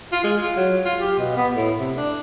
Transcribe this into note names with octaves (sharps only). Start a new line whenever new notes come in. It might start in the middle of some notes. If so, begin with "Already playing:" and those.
F4
G#3
F4
F#3
F4
G4
B2
B3
A2
C3
D4